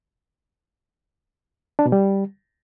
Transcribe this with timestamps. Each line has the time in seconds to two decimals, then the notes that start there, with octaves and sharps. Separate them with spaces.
1.79 D4
1.86 B2
1.92 G3